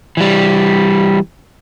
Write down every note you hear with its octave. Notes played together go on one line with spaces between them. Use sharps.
E3 G3